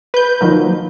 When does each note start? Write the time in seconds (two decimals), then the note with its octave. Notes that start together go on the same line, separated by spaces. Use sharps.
0.14 B4 G6
0.41 D#3 F3 F#3 A#3